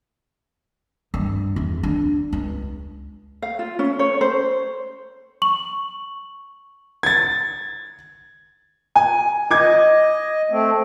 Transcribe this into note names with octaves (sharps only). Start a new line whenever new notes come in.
G2
E2
D4
C#2
F5
F4
C#4
C#5
C5
C#6 F#7
G#6 A6
G#5
D#5 D6 G#6
A3 C4